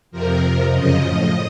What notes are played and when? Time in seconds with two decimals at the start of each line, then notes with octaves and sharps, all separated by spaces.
0.11 F2 C3 F3 A#4
0.42 F2 C3 F3
0.71 F#2 C#3 F3 D#5
1.01 A2 F3